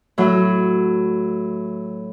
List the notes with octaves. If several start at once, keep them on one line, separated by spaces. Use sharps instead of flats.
A2 F#3